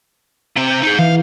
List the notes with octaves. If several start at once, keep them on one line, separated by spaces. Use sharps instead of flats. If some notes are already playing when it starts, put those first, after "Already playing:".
C3 C4
G6
D#4 G#4
E3 F5